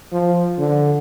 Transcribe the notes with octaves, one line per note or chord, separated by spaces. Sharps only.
F3
D3